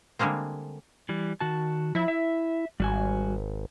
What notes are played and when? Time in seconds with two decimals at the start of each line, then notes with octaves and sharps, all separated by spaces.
0.19 D3 G3 G#3 A#3 C4
1.09 E3 G3
1.40 D#3 F#4 A5
1.95 F3 E4 E5
2.08 E5
2.80 G#1 G3 F#4 G#5